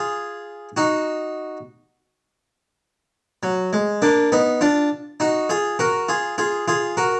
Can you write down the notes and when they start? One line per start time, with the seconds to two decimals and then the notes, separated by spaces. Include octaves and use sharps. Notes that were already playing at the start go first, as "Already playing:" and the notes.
Already playing: F4 G#4
0.77 D#4 F#4
3.43 F#3
3.73 G#3
4.02 A#3 D4
4.32 B3 D#4
4.61 D4 F4
5.20 D#4 F#4
5.49 F4 G#4
5.79 F#4 A#4
6.09 F4 G#4
6.38 F4 G#4
6.68 F4 G#4
6.97 F#4 A#4